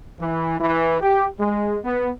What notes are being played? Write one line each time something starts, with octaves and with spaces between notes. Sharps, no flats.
E3
E3
G4
G#3
B3